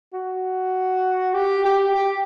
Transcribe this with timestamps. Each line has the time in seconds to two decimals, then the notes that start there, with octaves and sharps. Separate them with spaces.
0.14 F#4
1.34 G4
1.65 G4
1.95 G4